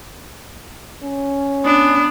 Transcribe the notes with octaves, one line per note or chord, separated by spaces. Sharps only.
C#4
B3 D4